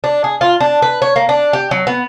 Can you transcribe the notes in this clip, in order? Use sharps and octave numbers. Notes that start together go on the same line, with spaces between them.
D4
G#4
F4
D4
B4
C#5
A#3
D4
G4
F#3
B3